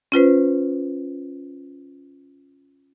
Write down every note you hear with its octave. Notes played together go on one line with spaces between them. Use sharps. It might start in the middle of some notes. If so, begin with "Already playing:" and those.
C#4 F4 B4 C5